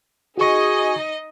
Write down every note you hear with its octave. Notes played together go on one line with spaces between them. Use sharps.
D#4 F#4 G#4 D#5 C#6